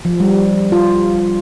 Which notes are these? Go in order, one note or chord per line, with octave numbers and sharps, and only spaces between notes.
F3
G3
F4